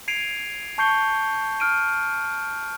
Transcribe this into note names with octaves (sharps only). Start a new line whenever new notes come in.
G#6 C7 D7 D#7 F7
A5 C#6 G6 C7 C#7 G7
F6 D7 D#7